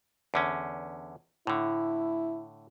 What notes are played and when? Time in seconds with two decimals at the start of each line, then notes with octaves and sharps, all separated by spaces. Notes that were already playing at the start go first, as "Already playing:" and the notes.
0.34 E2 D3 C#4
1.47 A2 D3 E4